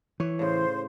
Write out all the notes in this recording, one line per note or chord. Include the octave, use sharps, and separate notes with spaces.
E3 C#5
A2 C#3 C5